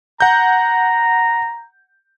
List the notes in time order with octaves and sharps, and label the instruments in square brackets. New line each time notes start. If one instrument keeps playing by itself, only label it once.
[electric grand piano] F#5 G6 [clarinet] A#5